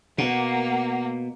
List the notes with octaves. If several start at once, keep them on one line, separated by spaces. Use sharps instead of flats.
B2 A#3 F#5